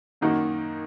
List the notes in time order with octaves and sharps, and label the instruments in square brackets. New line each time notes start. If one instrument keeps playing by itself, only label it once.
[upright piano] F#2 D#3 A#3 D#4 F#4